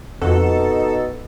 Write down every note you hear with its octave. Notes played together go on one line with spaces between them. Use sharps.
F2 B2 D#4 F#4 A4